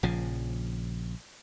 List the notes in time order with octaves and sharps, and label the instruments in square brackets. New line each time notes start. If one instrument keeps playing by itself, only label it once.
[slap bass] A#1 C#3 F3